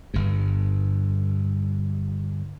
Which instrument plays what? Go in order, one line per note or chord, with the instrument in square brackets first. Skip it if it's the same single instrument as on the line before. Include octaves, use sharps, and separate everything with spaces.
[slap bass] G1 G2